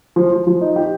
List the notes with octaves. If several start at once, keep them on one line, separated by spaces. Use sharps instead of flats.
F3
F3
F3
D#4
G4